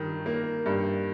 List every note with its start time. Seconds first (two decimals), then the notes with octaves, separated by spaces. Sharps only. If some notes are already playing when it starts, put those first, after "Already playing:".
Already playing: G2 D#3
0.26 A#3
0.66 G2